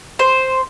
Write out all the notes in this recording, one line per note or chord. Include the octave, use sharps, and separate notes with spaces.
C5